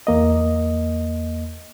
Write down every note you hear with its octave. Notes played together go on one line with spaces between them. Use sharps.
E2 A#3 D#5